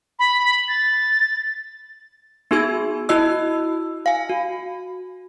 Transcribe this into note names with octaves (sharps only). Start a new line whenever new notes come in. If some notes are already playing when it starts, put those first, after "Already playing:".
B5
A6
B3 D#4 F#4 G#4 E6 G#6
E4 F#4 D#5 E6
F5 G#5
F#4